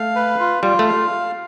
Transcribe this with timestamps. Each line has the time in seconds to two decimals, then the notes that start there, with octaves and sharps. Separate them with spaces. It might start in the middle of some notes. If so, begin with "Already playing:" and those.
Already playing: A3 F5
0.15 B4
0.40 F4
0.63 G3 F4
0.79 A3
0.87 F5